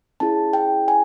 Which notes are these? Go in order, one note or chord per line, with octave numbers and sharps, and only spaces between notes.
C#4 E4 G#4 A5
G5
G#5